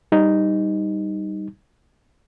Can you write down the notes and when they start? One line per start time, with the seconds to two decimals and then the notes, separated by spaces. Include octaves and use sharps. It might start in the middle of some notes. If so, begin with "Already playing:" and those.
0.12 G3 D#4